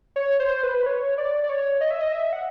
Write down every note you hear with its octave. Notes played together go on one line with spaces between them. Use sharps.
C#5
C5
B4
C#5
D5
D5
C#5
D#5
E5
D#5
E5
F#5